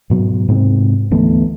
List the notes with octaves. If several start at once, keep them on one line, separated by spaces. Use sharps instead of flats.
G#2 B2 F#3
G#2 C3 C4
D2 E3 A3 B3